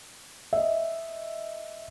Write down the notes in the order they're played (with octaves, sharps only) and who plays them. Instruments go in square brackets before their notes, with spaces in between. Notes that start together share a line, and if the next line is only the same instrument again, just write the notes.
[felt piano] D#5 E5